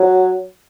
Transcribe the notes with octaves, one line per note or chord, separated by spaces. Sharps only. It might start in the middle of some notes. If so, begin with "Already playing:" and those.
Already playing: F#3